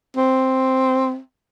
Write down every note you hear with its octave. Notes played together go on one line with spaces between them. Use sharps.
C4